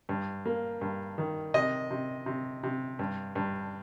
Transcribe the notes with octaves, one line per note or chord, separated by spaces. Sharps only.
G2
A#3
G2
D#3
C3 D#5
C3
C3
C3
G2
G2